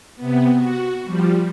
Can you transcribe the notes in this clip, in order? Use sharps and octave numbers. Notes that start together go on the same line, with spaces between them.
C3 B3
F#4
F3 G3